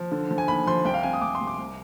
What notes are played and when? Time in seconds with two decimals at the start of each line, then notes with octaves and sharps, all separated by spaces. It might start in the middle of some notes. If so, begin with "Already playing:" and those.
Already playing: F3
0.12 D3
0.31 F3
0.38 G#5
0.48 D#2 B5
0.67 F3 C6
0.85 C2 G5
0.94 F5
1.03 C3 G#5
1.13 D#6
1.22 C2 D6
1.35 C6
1.41 C2
1.47 D6
1.58 C2